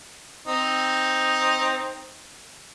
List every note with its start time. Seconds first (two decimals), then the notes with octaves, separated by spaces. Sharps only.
0.48 C4 D#4